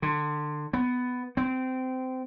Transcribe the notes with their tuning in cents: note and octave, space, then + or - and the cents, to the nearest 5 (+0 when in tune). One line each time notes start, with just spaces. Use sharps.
D3 +25
B3 +10
C4 -20